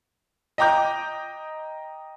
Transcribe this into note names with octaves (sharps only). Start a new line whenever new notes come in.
D#5 G5 A#5 D6 G6